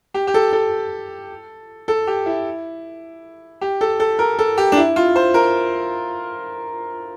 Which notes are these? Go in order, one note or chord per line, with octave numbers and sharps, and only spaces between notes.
G4
G4
A4
A4
A4
G4
E4
G4
A4
A4
A#4
A4
G4
D4
E4
F4
C5
A#4